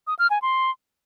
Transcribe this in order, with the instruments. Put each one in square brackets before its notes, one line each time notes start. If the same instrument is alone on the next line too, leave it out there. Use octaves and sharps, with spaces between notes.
[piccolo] D#6
F6
G#5
C6